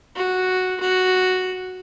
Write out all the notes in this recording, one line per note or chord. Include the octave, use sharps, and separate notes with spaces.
F#4
F#4